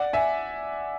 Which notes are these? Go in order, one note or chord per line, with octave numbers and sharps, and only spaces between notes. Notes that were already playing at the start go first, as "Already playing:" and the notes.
Already playing: D5 F#5
E5 G#5